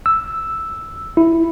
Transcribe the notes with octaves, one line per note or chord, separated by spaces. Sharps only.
E6
E4